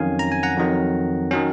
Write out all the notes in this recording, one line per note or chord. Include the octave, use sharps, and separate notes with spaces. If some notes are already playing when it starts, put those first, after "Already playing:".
Already playing: F2 D#3 F#3 C#4 F5 G#5
A#5
G#5
F#5 A#5
F2 D#3 F#3
D#3 F#3 C#4